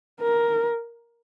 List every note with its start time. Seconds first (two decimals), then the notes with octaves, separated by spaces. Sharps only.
0.21 A#4